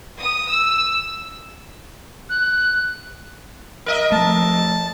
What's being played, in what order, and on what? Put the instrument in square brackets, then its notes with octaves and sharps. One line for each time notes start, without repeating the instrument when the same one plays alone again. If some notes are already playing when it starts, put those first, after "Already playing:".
[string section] D#6
E6
[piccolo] F#6
[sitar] A#4 D#5 E5
[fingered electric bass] F3 A3 [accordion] A5